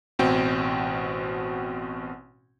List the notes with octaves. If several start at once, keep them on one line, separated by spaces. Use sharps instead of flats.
A1 B2 C4 F#4 G5